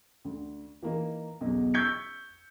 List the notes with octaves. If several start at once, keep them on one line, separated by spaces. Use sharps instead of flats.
D2
E3 A#3 D#4
B1 E2
C#6 E6 G6 G#6 B6 C#7